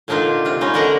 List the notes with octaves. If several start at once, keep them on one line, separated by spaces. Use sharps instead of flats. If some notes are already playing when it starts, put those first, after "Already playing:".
A#2 D3 D4 D#4 F4
C3 F4
B3 C#4 D#4
D3 D4 A#4 D#5 F#5 A#5